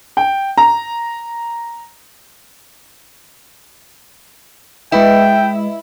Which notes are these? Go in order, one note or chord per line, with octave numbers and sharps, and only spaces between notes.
G5
A#5
G#3 E4 B4 D#5 G5